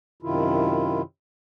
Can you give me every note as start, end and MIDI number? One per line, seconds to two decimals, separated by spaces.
0.22 1.02 42
0.22 1.02 48
0.22 1.02 51
0.22 1.02 64
0.22 1.02 65